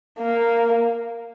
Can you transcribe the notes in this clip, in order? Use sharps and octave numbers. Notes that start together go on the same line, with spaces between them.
A#3